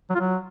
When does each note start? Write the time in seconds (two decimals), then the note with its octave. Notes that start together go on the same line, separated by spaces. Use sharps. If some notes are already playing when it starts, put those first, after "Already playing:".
0.10 F#3
0.15 F4
0.20 F#3